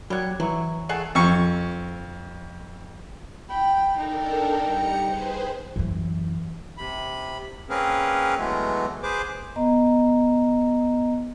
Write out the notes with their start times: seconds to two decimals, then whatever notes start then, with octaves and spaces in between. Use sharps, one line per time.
0.10 F#3 G3 F#5 G#6
0.40 E3 F#3 E4 C#6
0.89 A3 G#4 F#5
1.15 F2 C#6
3.49 G5 B5
3.97 D4 D#4 A4 A#4 G5
4.63 G3 A#5 C#7
5.00 G#4 B4 C5
5.76 F#2 E3
6.78 C3 B5
7.70 A#3 C4 C#4 G#4 A#4 B4
8.37 E3 F#3 G#3 A3 B3
9.03 G#4 B4 C5 D6
9.56 B3 D#5 A#5